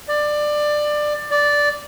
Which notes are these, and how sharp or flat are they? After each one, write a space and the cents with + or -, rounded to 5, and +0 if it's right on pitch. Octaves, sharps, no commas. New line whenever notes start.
D5 +20
D5 -5